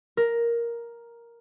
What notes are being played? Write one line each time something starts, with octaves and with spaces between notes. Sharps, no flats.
A#4